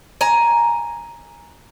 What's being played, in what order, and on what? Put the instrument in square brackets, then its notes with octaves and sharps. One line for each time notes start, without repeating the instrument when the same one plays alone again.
[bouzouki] G#5 A#5